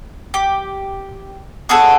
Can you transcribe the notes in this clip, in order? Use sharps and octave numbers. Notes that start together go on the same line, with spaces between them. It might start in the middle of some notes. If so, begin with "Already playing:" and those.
G4
B3 F#4 G#4 A4